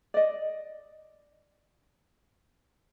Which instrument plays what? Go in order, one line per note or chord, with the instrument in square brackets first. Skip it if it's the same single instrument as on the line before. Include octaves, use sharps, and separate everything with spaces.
[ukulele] D5 D#5